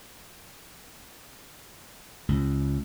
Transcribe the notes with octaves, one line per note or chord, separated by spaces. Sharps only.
C#2